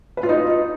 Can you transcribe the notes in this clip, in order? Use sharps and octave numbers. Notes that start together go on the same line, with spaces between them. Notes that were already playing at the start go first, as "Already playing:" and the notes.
B4
F4
D#4